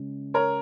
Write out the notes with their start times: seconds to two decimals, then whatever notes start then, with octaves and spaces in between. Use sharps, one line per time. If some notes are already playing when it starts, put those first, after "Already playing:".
Already playing: C#3 G#3
0.34 A#4 C#5